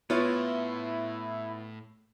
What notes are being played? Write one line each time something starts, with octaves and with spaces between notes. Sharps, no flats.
A2 B3 E4 F4 C#5